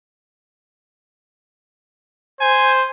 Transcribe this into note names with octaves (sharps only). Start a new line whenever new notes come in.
C5 G#5